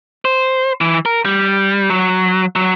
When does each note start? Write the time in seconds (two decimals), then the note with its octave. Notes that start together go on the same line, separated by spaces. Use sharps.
0.25 C5
0.81 E3
1.06 A#4
1.25 G3
1.90 F#3
2.56 F#3